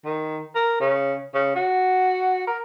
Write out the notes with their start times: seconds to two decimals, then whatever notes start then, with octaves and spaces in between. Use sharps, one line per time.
0.05 D#3
0.55 A#4
0.80 C#3
1.34 C#3
1.55 F#4
2.47 A#4